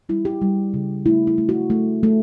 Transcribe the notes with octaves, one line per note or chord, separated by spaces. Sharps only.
G3 E4
G4
G3
C#3
A3 E4
E4
A3
F#4
A3
A3